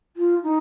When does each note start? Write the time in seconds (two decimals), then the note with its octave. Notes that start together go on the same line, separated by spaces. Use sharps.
0.17 F4
0.43 D#4